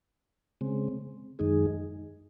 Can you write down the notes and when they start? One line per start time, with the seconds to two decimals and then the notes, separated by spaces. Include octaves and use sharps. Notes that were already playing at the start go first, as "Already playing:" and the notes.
0.61 C#3 G#3 C4
1.39 F#2 D#3 G#3 D#4 G#4